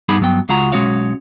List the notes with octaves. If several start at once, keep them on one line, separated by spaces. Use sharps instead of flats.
G2 G3 B3 D#4 G#4 B5
G2 F#3 B3 G5
C#2 G#3 F4 F#4 A#5
B1 G#3 C#4 F#4 C#5 F5